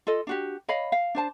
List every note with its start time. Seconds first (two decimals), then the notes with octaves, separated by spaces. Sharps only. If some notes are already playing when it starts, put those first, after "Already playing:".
0.07 F4 A4 D#5
0.27 D4 F#4 G4
0.68 C#5 D#5 F5 B5
0.92 F5
1.15 D4 C5 A5